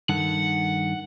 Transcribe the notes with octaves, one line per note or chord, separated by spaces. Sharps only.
G2 D#3 A4 F#5